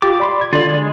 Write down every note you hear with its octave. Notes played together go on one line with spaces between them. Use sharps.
F4 G4 D6 A6
D5 B5 C6
G#6
D3 F4 D5
G#3